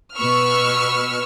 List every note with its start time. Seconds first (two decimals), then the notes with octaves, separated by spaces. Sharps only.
0.15 B2 B4 C#6 E6 F6